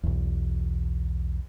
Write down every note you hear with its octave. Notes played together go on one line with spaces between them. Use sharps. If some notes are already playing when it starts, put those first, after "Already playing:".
B1 E2